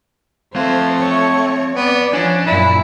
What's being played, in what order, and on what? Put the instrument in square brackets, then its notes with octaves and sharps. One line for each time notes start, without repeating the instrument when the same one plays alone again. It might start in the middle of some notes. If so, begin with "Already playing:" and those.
[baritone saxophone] A3 [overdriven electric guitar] C4 F5 [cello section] C5
[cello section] C#5
[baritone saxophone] B3 [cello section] D5
[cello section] F3 [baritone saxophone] C#4 [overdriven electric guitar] D4
[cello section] F#2 A#2 [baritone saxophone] E4